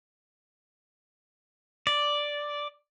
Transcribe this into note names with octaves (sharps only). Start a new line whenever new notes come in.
D5